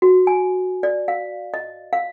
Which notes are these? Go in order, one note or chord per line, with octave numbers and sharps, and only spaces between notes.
F#4
G#5
D5
F5
D#5
F5